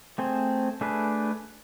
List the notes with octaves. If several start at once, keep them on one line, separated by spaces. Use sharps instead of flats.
A3 C4 G#4 C5
A3 D4 G#4 B4